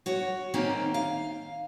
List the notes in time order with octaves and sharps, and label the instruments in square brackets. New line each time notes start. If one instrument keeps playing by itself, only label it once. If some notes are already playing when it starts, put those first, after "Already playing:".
[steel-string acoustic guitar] F#4 C#5
D#3 A#3 C4 C#4
F5